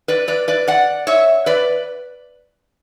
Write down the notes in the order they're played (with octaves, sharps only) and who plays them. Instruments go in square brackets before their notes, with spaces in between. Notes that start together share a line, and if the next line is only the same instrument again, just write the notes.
[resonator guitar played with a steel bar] B4 D5
B4 D5
B4 D5
D5 F#5
C#5 E5
B4 D5